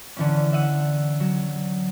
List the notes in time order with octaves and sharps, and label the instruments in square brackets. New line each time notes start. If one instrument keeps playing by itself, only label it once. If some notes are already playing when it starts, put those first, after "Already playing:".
[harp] D3 E3 C#4
E5 F#5 D#7
F#3